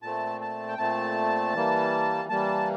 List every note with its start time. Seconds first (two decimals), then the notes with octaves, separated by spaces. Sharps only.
0.02 A#2 A3 C4 A5
0.41 A5
0.68 G5
0.78 A#2 A3 C4 A5
1.55 E3 G3 A#3
2.29 E3 G3 A#3 A5